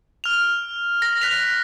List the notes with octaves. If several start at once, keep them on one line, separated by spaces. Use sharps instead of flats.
F6 F7
A#6
F#6 B6 F7